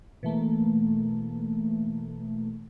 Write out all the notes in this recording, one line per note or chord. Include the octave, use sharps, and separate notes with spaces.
B2 E3 A3 A#3